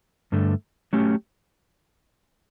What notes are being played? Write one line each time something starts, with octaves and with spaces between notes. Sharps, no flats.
G2 D3 A3
F#3 A3 C#4 G4